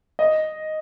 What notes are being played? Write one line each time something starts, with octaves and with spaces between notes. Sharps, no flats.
D#5